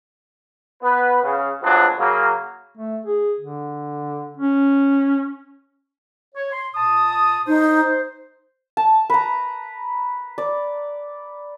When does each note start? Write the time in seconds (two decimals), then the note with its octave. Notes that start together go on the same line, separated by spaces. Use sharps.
0.83 B3 B4
1.23 C#3
1.63 F2 F3 F#3 G#3 B3 D4
1.99 C#3 F#3 A#3
2.78 A3
3.06 G#4
3.40 D3
4.37 C#4
6.35 C#5
6.52 C6
6.74 A#2 A5 D#6
7.47 D#4 C5
8.77 A5
9.10 B4 A#5
10.38 D5